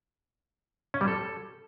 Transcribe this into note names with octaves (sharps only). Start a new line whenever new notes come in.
C#4
G3
A4